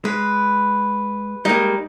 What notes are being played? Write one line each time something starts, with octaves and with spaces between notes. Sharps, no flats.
G#3 B4
G3 G#3 A#3 D#4